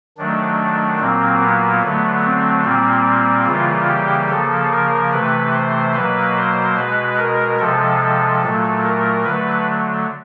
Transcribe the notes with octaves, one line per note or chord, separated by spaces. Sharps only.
D#3 F#3 A3 D4
A#2 F#3 A#3 C4
B3
D3 F#3 A3
C4
A#2 G3 A#3 C4
C#3 E3 G3 A#3 F4
G4
C#3 F3 A#3 A4
A#4
C3 E3 A3 B4
C5
B2 F#3 A#3 B4
C5
B2 G#3 B4
A#4
C3 F3 G#3 A4
A#2 F#3 A3
A#4
D3 F#3 A3 B4